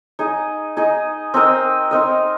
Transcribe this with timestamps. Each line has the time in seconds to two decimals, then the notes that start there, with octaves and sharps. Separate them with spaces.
0.19 D#4 G#4 D#5
0.77 D#4 G#4 D#5
1.34 C4 D#4 A#4 D#5
1.91 C4 D#4 A#4 D#5